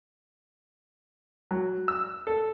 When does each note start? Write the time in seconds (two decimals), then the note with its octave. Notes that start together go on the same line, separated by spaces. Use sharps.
1.51 F#3
1.88 E6
2.27 A4